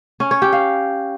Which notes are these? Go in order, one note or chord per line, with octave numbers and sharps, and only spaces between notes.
C#4
C#5
G4
F5